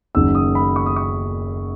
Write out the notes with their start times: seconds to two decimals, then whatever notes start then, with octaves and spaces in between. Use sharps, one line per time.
0.15 F#1 F#2 D#3 F#3 E6
0.35 D#6
0.55 B5
0.76 C#6
0.86 D#6
0.96 C#6